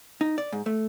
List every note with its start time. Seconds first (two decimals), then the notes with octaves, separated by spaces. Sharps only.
0.21 D#4
0.38 D5
0.52 G#2
0.66 A3